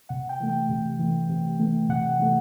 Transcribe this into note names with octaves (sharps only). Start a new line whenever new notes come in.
C3 F#5
G5
E3 A3
G5
C3
E3 A3
C3
E3 A3
C3 F#5
E3 A3